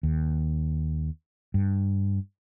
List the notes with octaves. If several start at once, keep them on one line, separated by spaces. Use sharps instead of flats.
D#2
G2